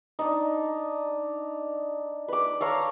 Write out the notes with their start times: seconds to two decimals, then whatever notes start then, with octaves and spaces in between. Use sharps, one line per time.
0.19 D4 D#4
2.28 B4 D6
2.60 A4 C#5 F5 A#5